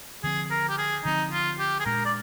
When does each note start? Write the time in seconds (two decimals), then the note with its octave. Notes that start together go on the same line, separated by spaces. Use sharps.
0.23 D3 F3 C4 G#4
0.51 A#4
0.69 G4
0.78 G#4
1.05 D3 F3 C4 D#4
1.32 F4
1.59 G4
1.80 G#4
1.85 A#2 G#3 D4 A#4
2.05 D5